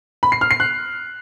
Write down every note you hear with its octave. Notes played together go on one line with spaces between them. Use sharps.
B5
C7
F6
C7
F#6